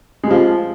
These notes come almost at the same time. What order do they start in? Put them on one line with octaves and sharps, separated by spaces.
G#3 G3 F3